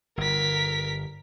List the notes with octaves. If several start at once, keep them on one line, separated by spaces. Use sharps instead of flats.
G1 A#4 B6